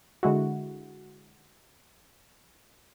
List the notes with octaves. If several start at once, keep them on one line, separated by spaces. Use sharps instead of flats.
D3 G#3 E4 F#4